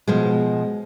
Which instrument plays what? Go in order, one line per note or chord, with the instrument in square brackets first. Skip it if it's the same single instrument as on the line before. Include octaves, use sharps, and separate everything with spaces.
[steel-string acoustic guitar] B2 F3 G#3